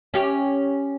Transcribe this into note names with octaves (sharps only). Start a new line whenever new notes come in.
C#4 G4